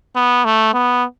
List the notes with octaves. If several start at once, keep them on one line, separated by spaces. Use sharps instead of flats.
B3
A3
B3